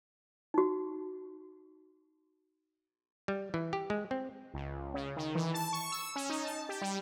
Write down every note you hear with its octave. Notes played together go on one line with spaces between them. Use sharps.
D#4 F#4
G3
E3
G4
G#3
C4
C#2
C#3
D#3
E3
A5
C#6
E6
C#4
D#4
A5
G4
G3